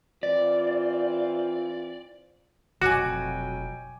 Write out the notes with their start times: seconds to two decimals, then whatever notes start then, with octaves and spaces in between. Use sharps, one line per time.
0.23 E3 C4 F4 D5
2.82 F1 B2 F#3 F#4 G5 G#5 D6